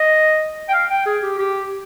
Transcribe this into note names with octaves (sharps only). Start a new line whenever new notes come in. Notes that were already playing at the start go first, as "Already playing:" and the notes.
Already playing: D#5
G5
F5
G5
G#4
G4
G4